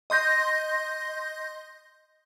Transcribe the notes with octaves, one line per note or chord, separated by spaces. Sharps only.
D#5 C6 G6 A#6